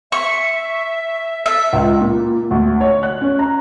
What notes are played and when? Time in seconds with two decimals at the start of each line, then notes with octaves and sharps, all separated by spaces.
0.12 E5 C#6
1.46 A4 E5
1.73 C#2
2.01 A#2
2.51 D2
2.81 C#5
3.03 F#6
3.21 C#4
3.39 A#5